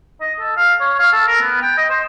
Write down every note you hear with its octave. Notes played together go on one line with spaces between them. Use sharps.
D#5
A4
F5
C#5
F5
A4
A#4
B3
G5
D#5
C5